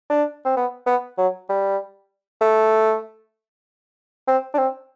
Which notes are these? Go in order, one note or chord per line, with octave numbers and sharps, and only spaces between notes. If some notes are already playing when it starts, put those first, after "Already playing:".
D4
C4
B3
B3
F#3
G3
A3
C4
D4
C4